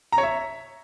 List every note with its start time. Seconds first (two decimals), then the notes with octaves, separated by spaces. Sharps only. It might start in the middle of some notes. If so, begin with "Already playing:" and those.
0.12 A#5
0.18 C#5
0.23 E5